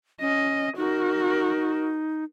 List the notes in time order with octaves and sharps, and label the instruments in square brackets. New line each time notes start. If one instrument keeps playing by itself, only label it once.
[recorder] C#4 [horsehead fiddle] D#5
[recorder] D#4 [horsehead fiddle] F#4 A#4